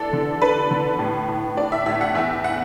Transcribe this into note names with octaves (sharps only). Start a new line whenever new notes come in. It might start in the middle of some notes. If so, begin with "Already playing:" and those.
Already playing: E3 D4 A4
D3
D4 B4
D3
A2
A2
D4 D5
E5
A2 E5
F#5
E2 E5
F#5